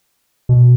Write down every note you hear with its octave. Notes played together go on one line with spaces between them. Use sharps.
B2